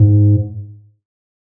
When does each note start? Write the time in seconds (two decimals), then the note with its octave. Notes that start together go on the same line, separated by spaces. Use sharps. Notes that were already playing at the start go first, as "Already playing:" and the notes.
Already playing: G#2